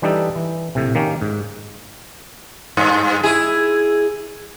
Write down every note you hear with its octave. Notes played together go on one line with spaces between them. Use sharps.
E3 G3 D4 D#4 G4 A4
E3
A#1 A2 C3
D#3 A#3 C#4 G4
G#2
G2
E4 G#4